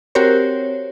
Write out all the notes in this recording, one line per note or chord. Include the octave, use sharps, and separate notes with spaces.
C4 F#4 G4 A#4 C5 C#5